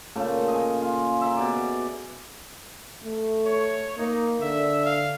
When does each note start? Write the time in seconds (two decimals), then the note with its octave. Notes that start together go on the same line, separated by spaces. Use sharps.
0.16 A#2 C#3 A3
0.48 G#4 D#5
0.81 F4
1.21 E5 A#5
1.37 B2 D5
3.04 A3
3.46 C#5
3.98 A#3 D#4
4.41 D3 E5
4.85 F5